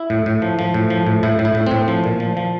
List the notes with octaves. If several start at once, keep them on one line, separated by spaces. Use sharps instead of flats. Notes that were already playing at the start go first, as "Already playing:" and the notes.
Already playing: E4
A2
A2
F3
F3
A2
F3
A2
A2 E4
A2
E4
A2
A2 C4
F3
A#2
F3
F3